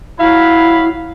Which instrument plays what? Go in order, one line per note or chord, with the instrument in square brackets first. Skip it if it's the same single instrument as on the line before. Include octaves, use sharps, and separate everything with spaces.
[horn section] F#3 F5 B5 [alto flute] E4